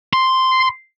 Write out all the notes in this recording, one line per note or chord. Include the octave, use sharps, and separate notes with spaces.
C6